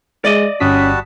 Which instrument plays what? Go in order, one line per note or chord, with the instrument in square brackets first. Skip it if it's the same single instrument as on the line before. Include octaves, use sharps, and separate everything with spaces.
[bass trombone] G#3 [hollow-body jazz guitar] D5 D#5
[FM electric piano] G1 D#6 B6 [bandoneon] G3 F#4 A5 [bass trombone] C#4